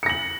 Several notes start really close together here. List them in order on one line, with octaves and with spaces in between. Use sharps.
C#7 A#6 F#7